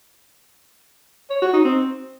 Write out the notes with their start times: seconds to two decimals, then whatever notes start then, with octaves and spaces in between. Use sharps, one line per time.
1.30 C#5
1.42 F#4
1.53 D#4
1.65 C4